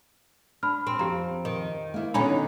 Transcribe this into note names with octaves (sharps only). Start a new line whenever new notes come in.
D4 B5 F6
C4
F2 G4 A#5
D#3
A#3 E4
B2 D3 D#3 C#4 D#4 B5